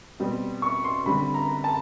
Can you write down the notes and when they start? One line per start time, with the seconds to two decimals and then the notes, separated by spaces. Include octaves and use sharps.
0.20 B2 G3 C4
0.62 C#6
0.84 C6
1.06 D3 G3 C4 B5
1.34 A#5
1.64 A5